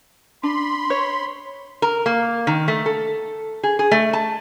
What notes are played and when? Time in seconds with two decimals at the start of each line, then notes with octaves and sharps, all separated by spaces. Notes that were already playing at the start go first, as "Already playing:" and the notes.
0.43 D4 B5 C6
0.90 C#5
1.82 A#4
2.06 A#3
2.47 D#3
2.68 A3
2.86 A4
3.63 G#4
3.79 G#4
3.91 A3
4.13 A5